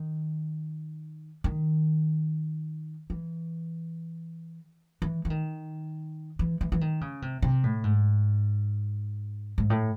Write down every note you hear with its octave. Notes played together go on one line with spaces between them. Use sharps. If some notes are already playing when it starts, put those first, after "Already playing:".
Already playing: D#3
D#3
E3
E3
E3
D#3
E3
E3
E3
D#3
C#3
C3
C3
A2
G#2
G#2
A2